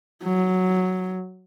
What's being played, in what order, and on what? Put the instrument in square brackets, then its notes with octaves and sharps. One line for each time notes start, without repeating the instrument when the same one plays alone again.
[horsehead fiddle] F#3